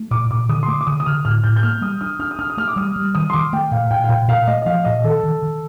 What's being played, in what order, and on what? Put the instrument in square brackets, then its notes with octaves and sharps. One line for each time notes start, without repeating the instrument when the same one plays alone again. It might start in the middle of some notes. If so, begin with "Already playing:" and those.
Already playing: [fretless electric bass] A3
[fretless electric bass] A#2 [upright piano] D6
[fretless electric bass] A#2 [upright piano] D6
[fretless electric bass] D3 [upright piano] D#6
[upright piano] C6
[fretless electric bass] A3 [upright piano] D6
[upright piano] D6
[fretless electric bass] D3 [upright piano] D#6
[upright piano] D#6
[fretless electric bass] D3 [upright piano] F6
[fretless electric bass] A2 [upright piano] F6
[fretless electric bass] A2 [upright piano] G6
[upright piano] G6
[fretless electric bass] A#3 [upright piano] F6
[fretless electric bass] G3 [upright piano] D#6
[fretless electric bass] D4 [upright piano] D#6
[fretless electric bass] D4 [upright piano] F6
[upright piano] D#6
[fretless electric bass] D4 [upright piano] F6
[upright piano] D#6
[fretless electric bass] A3 [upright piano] F6
[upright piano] D6
[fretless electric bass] G3 [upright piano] D#6
[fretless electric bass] G3
[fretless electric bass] D#3 [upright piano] D#6
[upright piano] C6
[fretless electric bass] D#3 [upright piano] D6
[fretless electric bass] A3 [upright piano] G5
[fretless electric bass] A#2 [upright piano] F5
[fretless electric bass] A#2 [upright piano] G5
[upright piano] F5
[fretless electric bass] A#2 [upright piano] G5
[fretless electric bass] A#2 [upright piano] F5
[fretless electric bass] A3 [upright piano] D#5
[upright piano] D#5
[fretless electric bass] F3 [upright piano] F5
[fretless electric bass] A#2 [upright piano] D#5
[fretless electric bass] D#3 [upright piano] A4
[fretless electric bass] D#3
D#3